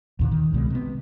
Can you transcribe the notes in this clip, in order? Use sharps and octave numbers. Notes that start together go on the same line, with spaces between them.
D#2 A#2 D3
D#3
C2 B2 G#3
C3 B3